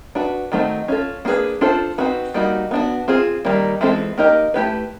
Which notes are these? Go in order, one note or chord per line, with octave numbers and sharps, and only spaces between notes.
D4 F#4 B4
D#3 F#3 A3 C4 D#4
C#4 F4 A4
A#3 D4 F4 G#4 B4
D4 F4 A4 C5
C4 D#4 F#4 B4
G3 A#3 D#4 F#4
B3 D4 F#4
C4 F4 G#4
D#3 G3 A#3 D#4
E3 G#3 C4 F4 A4
A#3 D#4 G4 A#4 D#5
A3 C#4 E4 G4 B4